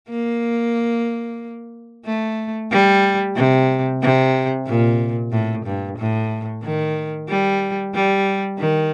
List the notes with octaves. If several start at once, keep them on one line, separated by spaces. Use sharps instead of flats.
A#3
A3
G3
C3
C3
A#2
A2
G2
A2
D#3
G3
G3
D#3